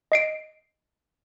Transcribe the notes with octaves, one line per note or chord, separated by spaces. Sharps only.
D#5 C7 D7